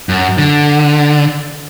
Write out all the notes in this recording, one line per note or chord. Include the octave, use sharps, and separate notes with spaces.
F#2
D3